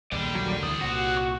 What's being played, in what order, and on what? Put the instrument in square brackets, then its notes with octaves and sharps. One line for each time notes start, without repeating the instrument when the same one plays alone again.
[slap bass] A#1 D#2 [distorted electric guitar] D3 [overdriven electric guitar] G3 D5
[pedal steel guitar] F#3 A#3
[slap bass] D2 D3 E3 [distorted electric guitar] C5 D5 [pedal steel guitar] D#6
[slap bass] C2 A#2 [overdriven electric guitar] F#4
[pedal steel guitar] C#6